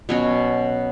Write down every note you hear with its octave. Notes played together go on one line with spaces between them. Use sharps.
B2 F#3 C#4 F#4